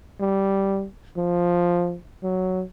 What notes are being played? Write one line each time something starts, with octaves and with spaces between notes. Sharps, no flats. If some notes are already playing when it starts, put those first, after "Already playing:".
G3
F3
F#3